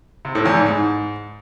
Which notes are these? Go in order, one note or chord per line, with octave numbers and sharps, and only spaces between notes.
C3
A2
E2
G#2
G#2